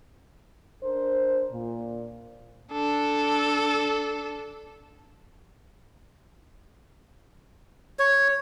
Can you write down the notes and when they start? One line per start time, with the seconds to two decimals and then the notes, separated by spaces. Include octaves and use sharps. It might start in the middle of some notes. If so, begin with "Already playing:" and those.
0.83 D4 A#4 C5
1.52 A#2
2.73 D4 A4
7.99 C#5